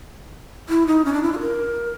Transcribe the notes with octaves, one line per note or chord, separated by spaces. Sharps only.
E4
D#4
C#4
D4
E4
F4
A#4